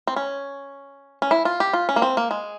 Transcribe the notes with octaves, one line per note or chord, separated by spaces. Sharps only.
C4
C#4
C#4
E4
F4
G4
F4
C#4
A#3
C4
A#3
G#3